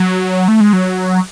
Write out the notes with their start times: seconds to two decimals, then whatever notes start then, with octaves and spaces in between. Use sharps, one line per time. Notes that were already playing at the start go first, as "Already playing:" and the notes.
Already playing: F#3
0.48 A3
0.61 G#3
0.73 F#3